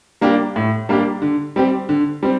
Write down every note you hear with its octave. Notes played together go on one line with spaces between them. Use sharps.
G3 A#3 D4 G4
A2
G3 A#3 D4 G4
D3
G3 C4 G4
D3
G3 C4